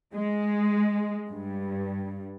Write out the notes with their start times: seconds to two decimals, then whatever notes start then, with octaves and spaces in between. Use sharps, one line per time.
0.14 G#3
1.30 G2